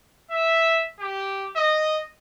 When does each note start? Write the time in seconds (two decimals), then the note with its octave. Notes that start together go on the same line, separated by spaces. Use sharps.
0.31 E5
1.00 G4
1.56 D#5